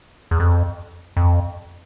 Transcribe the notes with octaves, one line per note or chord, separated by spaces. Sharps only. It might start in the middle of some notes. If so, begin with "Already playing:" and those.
E2
F2
F2